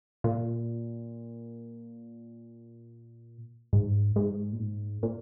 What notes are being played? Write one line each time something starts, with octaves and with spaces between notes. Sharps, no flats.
A#2
G#2
G#2
A#2
G#2
A#2